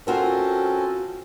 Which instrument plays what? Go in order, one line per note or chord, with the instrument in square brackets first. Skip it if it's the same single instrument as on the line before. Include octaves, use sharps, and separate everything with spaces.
[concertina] C4 C#4 A4 [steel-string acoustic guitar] F4 F#4 A#4